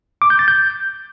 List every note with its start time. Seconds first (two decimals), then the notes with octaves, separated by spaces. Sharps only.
0.22 D6
0.30 G6
0.39 A6
0.48 G6